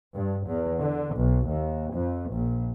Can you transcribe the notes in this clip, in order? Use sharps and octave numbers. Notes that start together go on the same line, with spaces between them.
G2
E2
D3
B1
D#2
F2
A#1